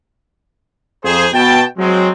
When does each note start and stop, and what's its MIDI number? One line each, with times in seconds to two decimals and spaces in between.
1.04 1.26 41
1.04 1.26 68
1.04 1.26 72
1.33 1.62 47
1.33 1.62 79
1.33 1.62 81
1.78 2.10 54
1.78 2.10 56
1.78 2.10 60